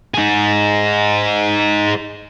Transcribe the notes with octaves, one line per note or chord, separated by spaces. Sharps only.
D#4 G#4